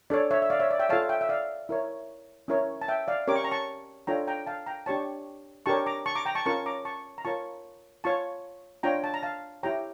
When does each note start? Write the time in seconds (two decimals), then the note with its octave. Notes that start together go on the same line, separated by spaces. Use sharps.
0.10 D4 A4 C#5 D5
0.31 C#5 E5
0.42 E5
0.50 D5 F5
0.60 C#5 E5
0.71 D5
0.79 E5 G5
0.89 F4 A4 C#5 F5 A5
1.09 E5 G5
1.21 E5
1.29 D5 F5
1.69 E4 A#4 C#5
2.48 C#4 E4 A#4 C#5
2.82 A5
2.88 E5 G5
3.08 D5 F5
3.28 C#4 G4 A#4 C#5 D6
3.36 C#6
3.44 A#5
3.51 A5 C#6
4.07 D4 F4 A4 C#5 G5 A#5
4.28 G5 A#5
4.47 F5 A5
4.66 G5 A#5
4.86 D4 G4 C#5 A5 C#6
5.66 D4 G4 A#4 C#5 A5 C#6
5.86 A#5 D6
6.06 A5 C#6
6.15 A#5 D6
6.26 G5 A#5
6.35 A5 C#6
6.46 C#4 F4 A#4 C#5 A5 C#6
6.66 A#5 D6
6.85 A5 C#6
7.18 A#5
7.25 F4 A#4 C#5 A5 C#6
8.04 F4 C#5 A5 C#6
8.83 D4 F4 C#5 G5 A#5
9.04 A5
9.14 A#5
9.23 F5 A5
9.63 E4 G4 C#5 G5 A#5